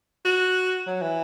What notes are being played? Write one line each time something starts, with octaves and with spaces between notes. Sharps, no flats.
F#4
F#3
E3